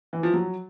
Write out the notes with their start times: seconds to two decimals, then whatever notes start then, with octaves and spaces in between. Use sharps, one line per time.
0.13 E3
0.23 F3
0.34 F#3